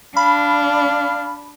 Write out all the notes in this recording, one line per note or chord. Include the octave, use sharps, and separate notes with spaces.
D4 F5 B5